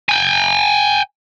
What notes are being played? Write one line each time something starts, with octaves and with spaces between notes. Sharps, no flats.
G5 G#5